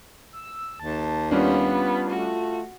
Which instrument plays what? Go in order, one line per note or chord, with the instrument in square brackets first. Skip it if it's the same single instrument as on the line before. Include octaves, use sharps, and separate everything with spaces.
[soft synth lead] E6
[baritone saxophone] D#2 [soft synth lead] A5
[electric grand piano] G3 C#4 D4 [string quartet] B3 [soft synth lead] F4
[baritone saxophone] A3 [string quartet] F#4